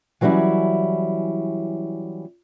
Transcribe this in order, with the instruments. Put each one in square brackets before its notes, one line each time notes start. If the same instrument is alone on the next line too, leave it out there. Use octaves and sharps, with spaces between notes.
[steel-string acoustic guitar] E3 F#3 G3 C#4 E4